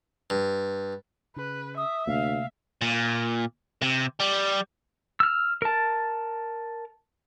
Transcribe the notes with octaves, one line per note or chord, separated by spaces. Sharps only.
G2
C#3 B4
E5 D#6
D2 C3 A3 A#3 F5
A#2
C3
G3
E6 F6
A#4 A5